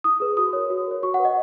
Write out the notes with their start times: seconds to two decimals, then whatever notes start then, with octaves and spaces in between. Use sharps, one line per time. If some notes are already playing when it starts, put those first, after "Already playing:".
0.04 E4 D#6
0.20 G#4 B4
0.37 F#4 D#6
0.53 A#4 C#5
0.70 F#4
0.87 A#4 C#5
1.03 F#4 C#6
1.14 F#5
1.19 B4
1.25 D#5